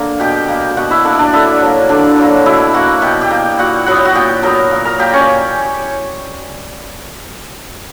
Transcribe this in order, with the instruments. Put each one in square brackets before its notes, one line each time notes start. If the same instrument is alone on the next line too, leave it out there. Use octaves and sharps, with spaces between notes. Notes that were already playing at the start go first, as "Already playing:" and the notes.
Already playing: [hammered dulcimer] D3 A#3 A#4
B2 G4 G5
A#3
G5
B2 F#4 F#5
E4 E5
A#3 D4 D5
D4 D5 E5
D3 E4 E5
F#3 A#3
D3 D4 D5
F#3 A#3
B2 E4 E5
A#3 F#4 F#5
B2 G4 G5
G4 G5
A#3
A#2 F#4 F#5
F#3 B3 F#5
G5
F#4 F#5
A#2 G4 G5
F#3 B3 A#4 A#5
A#2
A#4 A#5
A#3 G4 G5
C#4 C#5 D5